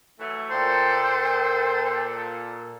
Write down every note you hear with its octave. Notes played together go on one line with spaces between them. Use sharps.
E3 F#3 A3
A#2 A4 C5 G5